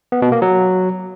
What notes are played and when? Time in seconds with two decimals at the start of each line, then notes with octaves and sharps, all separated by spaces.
0.12 B3
0.22 B2
0.32 A#3
0.42 F#3